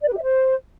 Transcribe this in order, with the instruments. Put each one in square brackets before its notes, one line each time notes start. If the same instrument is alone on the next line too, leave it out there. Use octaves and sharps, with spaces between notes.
[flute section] D5
B4
G4
E5
C5